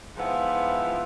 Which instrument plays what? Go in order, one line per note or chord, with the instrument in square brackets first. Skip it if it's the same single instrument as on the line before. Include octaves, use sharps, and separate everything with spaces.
[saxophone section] G#2 F3 B3 E4 F4 E5